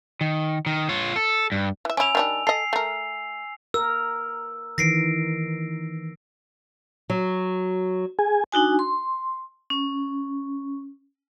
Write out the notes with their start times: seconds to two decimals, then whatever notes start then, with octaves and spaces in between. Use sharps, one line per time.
0.21 D#3
0.66 D#3
0.89 F4 C#5
1.16 A4
1.52 G2
1.85 E3 E5
1.97 C#4 E4 G#5 E6 F7
2.15 D#3 G3 D4
2.47 A4 D#5 C7
2.73 A3 A#4
3.74 A#4 E6
4.78 D#3 E3 A#6 C7 D7
7.10 F#3
8.19 G#4 G#5
8.52 D4 D#4 F#4 G#5
8.79 C6
9.70 C#4